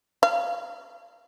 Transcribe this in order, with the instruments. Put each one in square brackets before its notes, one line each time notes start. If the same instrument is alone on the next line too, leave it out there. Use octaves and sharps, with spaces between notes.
[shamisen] F5